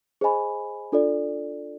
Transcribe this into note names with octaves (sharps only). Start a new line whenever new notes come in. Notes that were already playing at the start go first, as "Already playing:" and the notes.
G#4 C5 D#5 G#5 B5
D4 F4 A4 D5